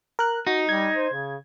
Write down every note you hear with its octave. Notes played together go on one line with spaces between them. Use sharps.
A#4 F#6
D#4 F#4
G3 G#6
C5
C#3